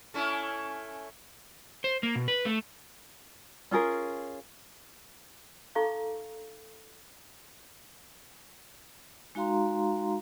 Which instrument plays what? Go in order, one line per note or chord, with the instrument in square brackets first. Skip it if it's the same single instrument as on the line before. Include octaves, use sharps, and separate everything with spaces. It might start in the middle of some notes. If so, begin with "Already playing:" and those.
[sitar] A3 C#4 E4
[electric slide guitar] C5
A#3
B2
B4
A3
[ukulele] C#4 F4 G#4 A#4
[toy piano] D#4 A4 F5 A#5 C#6 D6
[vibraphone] G#3 D#4 F#4 F5 A#5 C6